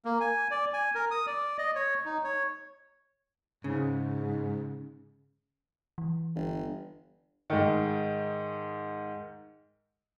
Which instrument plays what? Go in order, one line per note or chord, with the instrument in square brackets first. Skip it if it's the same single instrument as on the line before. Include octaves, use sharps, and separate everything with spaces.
[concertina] A#3
G#5
D5
G#5
A#4
D#6
D5
D#5
C#5
D#4
C#5
[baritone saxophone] G#2 [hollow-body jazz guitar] C#3
[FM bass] E3
[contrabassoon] G1
[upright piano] G#2 D#3